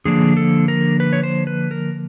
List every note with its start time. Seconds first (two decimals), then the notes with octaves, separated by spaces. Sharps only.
0.05 D3 F3 A#3 D4 G#4
0.37 A4
0.68 A#4
1.00 B4
1.13 C#5
1.23 C5
1.47 B4
1.71 A#4